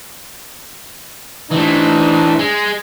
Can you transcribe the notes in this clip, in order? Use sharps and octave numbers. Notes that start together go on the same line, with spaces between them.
E3 A3 C4 D4 D#4
G#3